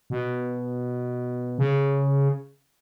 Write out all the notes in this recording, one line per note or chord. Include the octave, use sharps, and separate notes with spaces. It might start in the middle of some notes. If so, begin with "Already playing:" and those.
B2
C#3